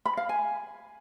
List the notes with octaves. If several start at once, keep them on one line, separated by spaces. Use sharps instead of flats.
B5
F5
G#5